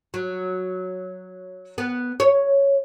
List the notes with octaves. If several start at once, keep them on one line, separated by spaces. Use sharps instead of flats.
F#3
B3
C#5